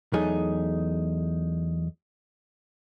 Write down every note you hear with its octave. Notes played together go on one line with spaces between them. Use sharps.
E2 F#3 A3 D#4 G#4